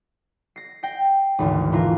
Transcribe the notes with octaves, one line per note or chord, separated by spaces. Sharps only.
A#6 C7
G5 A#6 C7
G#1 D2 E3
E1 E3 F4 A#4